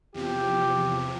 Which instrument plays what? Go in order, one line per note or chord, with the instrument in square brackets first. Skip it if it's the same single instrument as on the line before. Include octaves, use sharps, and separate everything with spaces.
[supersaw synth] E2 C3 F3 [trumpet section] G4